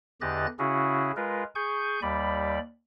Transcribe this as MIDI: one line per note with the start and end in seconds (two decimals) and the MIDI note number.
0.21 0.46 40
0.21 0.46 50
0.21 0.46 67
0.21 0.46 75
0.21 0.46 90
0.21 0.46 93
0.59 1.12 49
0.59 1.12 61
0.59 1.12 64
0.59 1.12 66
0.59 1.12 68
1.16 1.44 56
1.16 1.44 65
1.16 1.44 70
1.16 1.44 71
1.55 2.00 68
1.55 2.00 80
1.55 2.00 85
1.55 2.00 91
2.02 2.59 39
2.02 2.59 55
2.02 2.59 74
2.02 2.59 83